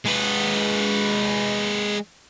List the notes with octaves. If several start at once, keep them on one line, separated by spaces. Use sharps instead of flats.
G#3 B4